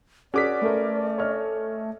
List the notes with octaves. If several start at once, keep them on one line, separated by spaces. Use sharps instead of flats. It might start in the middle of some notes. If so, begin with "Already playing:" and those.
C#4 F#4 G#4 A#4 D5 D6 B6
A3 A#4 B4
C#5 D#5 F6